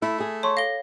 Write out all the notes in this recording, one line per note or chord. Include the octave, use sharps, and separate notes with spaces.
A3 E4
G#4
C#5 A5 C6 C#6
A4 F5 A#6 G7